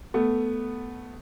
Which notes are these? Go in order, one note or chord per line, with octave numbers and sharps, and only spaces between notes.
A3 B3